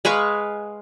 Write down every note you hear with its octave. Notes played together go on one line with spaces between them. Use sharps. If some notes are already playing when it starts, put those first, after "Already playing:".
G#3 B4 F5 C#6